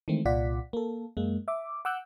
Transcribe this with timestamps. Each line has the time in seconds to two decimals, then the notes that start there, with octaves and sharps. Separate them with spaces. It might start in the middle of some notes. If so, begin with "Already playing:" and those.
0.08 D#3 E3 G#3 A3 C4
0.25 C2 A#2 F4 D5 F#5 B6
0.73 A#3 A4
1.17 F#2 G#3 A#3
1.48 E5 D6
1.85 F#5 D6 E6 F#6 G6